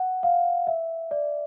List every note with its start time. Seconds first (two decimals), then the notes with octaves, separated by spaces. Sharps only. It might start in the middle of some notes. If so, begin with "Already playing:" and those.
Already playing: F#5
0.23 F5
0.67 E5
1.11 D5